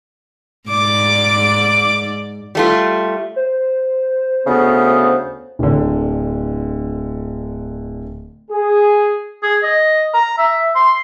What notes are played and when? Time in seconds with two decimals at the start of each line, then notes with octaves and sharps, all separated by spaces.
0.69 G#2 D5 D6
2.55 G3 A3 F4
3.36 C5
4.47 D2 C#3 B3
5.59 D1 D3
8.51 G#4
9.43 G#4
9.63 D#5
10.14 A#5
10.38 E5
10.75 C6